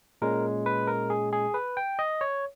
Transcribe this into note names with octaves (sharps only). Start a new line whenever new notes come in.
A#2 G#3 C#4 A#4
B4
A#4
G#4
G#4
B4
G5
D#5
C#5